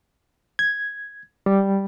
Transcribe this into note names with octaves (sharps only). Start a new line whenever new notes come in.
G#6
G3